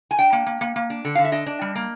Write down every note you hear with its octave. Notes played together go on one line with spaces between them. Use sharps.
G#5
D4 G5
A#3
A#3
A#3
A#3
D4
D3
D3 F5
E5
D4 D#5
D4
G3
A#3